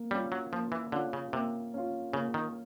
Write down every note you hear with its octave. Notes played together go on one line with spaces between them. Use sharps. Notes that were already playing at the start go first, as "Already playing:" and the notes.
Already playing: A#3
G3 C#4 F4
F#3
F3 A#3
E3
D3 C#4 F4
C#3
C3 A#3
C#4 F4
C#3 A#3
D#3